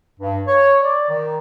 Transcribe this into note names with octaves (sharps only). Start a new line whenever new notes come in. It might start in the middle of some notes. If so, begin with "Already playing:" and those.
G2
C#5
D5
D#3